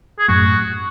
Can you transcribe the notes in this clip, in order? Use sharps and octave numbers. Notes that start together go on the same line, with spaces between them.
G#4
F#2 A2 F#4